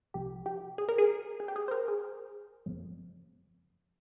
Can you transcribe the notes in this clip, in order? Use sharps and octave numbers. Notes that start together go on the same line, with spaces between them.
C2 C3 F3 G4
G4
G#4
A#4
G#4
G#4
G4
G#4
C5
A#4
G#4
G1 F2 C#3 F3